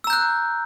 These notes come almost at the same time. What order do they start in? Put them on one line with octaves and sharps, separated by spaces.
E6 A#5 G6 F#6